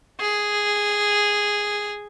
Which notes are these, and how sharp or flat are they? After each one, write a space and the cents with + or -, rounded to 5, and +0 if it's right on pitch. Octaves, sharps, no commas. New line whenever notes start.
G#4 -5